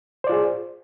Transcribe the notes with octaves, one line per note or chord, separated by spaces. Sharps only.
F4 G#4 C5 D5